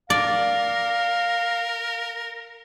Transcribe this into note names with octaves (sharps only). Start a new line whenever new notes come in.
A#4 D5 F5